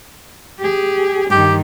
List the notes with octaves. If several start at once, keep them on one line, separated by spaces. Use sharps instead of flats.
G4 G#4
G2 D#3 G4